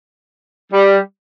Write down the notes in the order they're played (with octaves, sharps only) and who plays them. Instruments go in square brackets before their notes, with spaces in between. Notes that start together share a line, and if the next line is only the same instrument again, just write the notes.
[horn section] G3